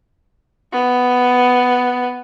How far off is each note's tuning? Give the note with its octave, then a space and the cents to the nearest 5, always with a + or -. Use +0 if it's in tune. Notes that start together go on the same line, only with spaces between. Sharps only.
B3 +5